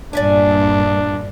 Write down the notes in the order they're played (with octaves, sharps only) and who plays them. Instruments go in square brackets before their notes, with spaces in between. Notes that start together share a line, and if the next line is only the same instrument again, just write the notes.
[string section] G2 A#2 [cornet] D4 [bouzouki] D5 E5 G#5